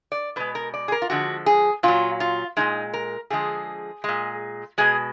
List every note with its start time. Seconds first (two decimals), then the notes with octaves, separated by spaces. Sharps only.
0.12 D5
0.36 B2 G#3 B4
0.55 A#4
0.74 D5
0.88 G#4
0.92 A#4
1.02 F4
1.10 D3 F3 G#3 F#4
1.46 G#4
1.83 A#2 F#3 F4
2.20 F4
2.57 A#2 F3 G#3 D#4
2.94 A#4
3.30 D3 F3 G#3 G#4
4.04 A#2 G#3
4.78 B2 G#3 G#4